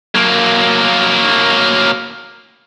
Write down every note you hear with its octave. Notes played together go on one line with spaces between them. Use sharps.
F#3 A#3